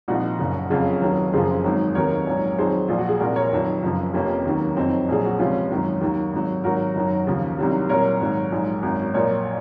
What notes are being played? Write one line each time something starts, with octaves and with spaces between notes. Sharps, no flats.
C2 A#2 F3 D#4 F#4
F#1 F#2 C#3
F#1 F2 C#3 F#3 F4 G#4
F1 D#2 D#3 F#3
F#1 F#2 C#3 F3 G#4 C5
G#1 G#2 D#3 F#3
F1 D#2 D#3 F#3 A#4 C#5
A#1 G#2 F#3
F2 D#3 F#3 G#4 C5
A#1 A#2 F3 F4
F#4
G#4
C2 A#2 F3 F#4 A#4
A#4 C#5
F1 F2 D#3 F#3
F#1 F#2 C#3 F3
F1 F2 C3 A#3 C#4
D#2 D#3 F#3
F#1 F2 D#3 F#3 C4 D#4
A#1 A#2 F#3 G#4
F#4
C#2 C3 F3 C#4 F4
G#1 F#2 D#3 F#3
D#2 D#3 F#3
G#1 G#2 F#3
G#1 G#2 F#3 F#4 A#4
F#1 F#2 D#3 F#3
D#2 C#3 F3
C2 C3 D#3 F#3
C2 A#2 F#3 A#4 C#5
G#1 G#2 F#3
A#1 G#2 F#3
G#1 F#2 D#3 F#3
A#1 A#2 F#3 A#4 C#5